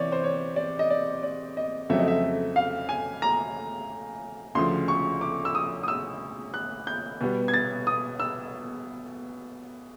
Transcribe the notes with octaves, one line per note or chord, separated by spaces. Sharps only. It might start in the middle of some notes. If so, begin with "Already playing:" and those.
Already playing: C3 E3 C#5 D5
C5
C#5
D5
D#5
D5
D5
D#5
F2 C#3 F#3 A3 C4 E5
D#5
E5
F5
G#5
A#5
D2 C#3 F3 C6
C#6
D6
E6
D#6
D#6
E6
F#6
G6
B2 G3 B3
G#6
A6
D#6
E6